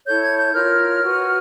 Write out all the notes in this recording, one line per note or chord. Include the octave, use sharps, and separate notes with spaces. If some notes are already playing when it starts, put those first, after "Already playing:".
E4 A4 C#5 G6
G#6
G6
F4 A#4 C#5 F6
F#4 B4